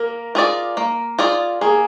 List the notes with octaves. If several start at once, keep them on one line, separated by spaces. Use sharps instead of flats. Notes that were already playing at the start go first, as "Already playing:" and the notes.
Already playing: A#3 A#4
F4 G#4 D5
A#3
F4 G#4 D5
A#3 G#4